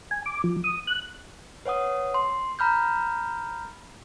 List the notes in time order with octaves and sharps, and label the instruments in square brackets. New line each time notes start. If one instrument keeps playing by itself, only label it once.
[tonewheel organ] G#5
D6
F3
D#6
F#6
[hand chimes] B4 C#5 F#5 D#6
C6
A#5 B5 F6 G6